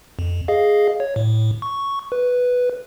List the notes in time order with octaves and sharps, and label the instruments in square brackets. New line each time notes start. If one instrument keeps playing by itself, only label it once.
[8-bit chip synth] F2
G#4 D#5 F5
C#5
A2
C#6
B4